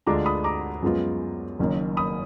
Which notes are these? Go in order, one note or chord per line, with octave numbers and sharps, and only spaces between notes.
D2 D3 G#3 D4 F4 A#5 D6
B5 D#6
A#5 D6
F#2 F3 G#3 B3 F4
F#1 F#2 D#3 A#3
B5 D#6